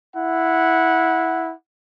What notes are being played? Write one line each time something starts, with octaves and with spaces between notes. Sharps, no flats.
E4 F#5